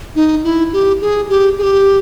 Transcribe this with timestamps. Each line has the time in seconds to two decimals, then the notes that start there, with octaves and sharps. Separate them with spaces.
0.16 D#4
0.44 E4
0.73 G4
1.02 G#4
1.29 G4
1.58 G#4
1.63 G4